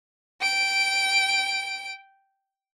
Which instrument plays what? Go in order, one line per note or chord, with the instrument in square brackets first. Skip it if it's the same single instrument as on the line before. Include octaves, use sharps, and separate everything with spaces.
[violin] G5 D7